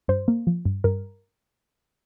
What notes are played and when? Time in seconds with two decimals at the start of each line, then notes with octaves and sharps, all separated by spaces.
0.08 G2 C5
0.28 A#3
0.47 F3
0.65 G2
0.84 G2 A#4